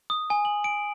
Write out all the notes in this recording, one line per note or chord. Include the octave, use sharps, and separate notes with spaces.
D#6
G#5
F#7
D7